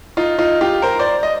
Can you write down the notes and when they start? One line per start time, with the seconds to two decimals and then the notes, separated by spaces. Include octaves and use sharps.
0.17 D#4 F4
0.39 D#4 F4
0.61 F4 G4
0.82 A#4 C5
0.99 C5 D5
1.23 D#5